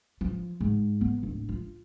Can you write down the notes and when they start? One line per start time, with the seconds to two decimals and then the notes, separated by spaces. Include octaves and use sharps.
0.21 F3
0.60 G#2
1.01 B3
1.23 D1
1.49 F4